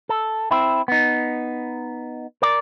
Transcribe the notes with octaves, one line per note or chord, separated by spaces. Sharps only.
A4
C4 E4
B3 D#4
A#4 D5